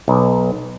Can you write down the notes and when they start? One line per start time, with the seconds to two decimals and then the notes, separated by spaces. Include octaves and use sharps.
0.08 B1